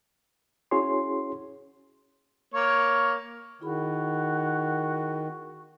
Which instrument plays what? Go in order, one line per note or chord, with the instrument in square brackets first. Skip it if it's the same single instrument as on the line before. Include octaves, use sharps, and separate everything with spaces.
[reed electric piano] C#4 E4 F#4 G#4 C#5 C6
[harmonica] A#3 C#5 C#6
[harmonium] D#3 [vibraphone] E4 G#4 B5 [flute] F#4